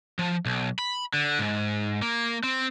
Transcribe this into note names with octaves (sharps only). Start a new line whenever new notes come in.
F3
B1
B5
D3
G#2
A#3
C4